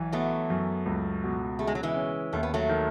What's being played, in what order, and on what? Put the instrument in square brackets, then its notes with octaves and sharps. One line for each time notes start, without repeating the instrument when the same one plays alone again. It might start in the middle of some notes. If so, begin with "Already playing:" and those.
Already playing: [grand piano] B1 E3
[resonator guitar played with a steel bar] F#3 A3 [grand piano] B3
[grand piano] F#2
C#2
B2
[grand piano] C#3 [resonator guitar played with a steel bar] A3
[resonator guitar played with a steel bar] G#3
F#3
E3 G#3
[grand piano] C#4
[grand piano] D#2 [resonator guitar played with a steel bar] A3
[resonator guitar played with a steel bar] B3
F#3 A3
[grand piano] D#3